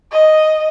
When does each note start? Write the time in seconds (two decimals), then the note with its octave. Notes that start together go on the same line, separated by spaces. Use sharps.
0.12 D#5